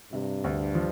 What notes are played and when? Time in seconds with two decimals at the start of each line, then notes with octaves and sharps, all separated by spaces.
0.13 G2 C3
0.44 D2
0.75 F3